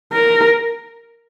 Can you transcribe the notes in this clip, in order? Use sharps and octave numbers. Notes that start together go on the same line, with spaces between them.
A#4